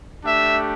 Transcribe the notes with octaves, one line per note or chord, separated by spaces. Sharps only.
A3 D4 G4 E5